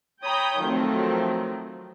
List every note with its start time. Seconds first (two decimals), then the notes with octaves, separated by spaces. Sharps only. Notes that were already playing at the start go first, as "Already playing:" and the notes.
0.24 C#5 G5 A#5 B5 D#6 G6
0.61 D#3 F3 F#3 A3 C4